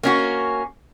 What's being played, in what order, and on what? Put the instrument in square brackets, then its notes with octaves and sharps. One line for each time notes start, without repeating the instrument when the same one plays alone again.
[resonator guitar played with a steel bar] A#3 C#4 F#4